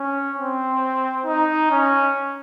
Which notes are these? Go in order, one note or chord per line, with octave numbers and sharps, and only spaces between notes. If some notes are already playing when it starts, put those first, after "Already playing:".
Already playing: C#4
C4
D#4
C#4